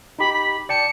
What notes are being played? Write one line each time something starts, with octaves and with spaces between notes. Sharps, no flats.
D#4 G4 B5
B5
D5 G5 A5 C#7